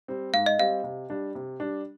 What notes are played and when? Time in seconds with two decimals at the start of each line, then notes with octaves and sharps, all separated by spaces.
0.08 G3 C4
0.33 G#2 F5
0.46 D#5
0.59 G3 C4 F5
0.84 C3
1.10 G3 D4
1.35 C3
1.60 G3 D4